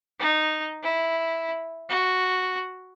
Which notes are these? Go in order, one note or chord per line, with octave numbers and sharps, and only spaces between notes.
D#4
E4
F#4